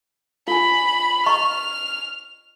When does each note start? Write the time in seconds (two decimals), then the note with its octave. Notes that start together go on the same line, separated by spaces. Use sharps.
0.48 F4 G#5 B5
1.26 D#5 A#5 C#6 F6